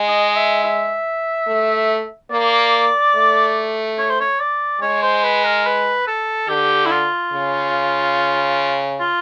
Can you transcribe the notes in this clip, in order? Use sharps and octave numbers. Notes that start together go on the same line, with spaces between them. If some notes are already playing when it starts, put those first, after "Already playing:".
Already playing: G#3
D#5
E5
E5
A3
A#3 D5
A3
C#5
C5
C#5
D5
G#3 C#5
C5
B4
A#4
B4
A4
D3 G4
E4
F4
C#3
F4